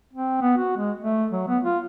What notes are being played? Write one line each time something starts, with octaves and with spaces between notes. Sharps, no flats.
C4
B3
F#4
G#3
A3
F#3
B3
F4